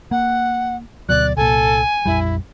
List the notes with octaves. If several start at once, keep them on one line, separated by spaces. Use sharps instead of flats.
A#3 F#5
D2 B2 F#3 D5 F#6
C2 A#2 A4 G#5
A#1 F2 G3 E4